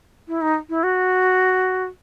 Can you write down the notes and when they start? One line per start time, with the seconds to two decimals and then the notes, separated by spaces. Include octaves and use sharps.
0.28 E4
0.41 D#4
0.69 E4
0.83 F#4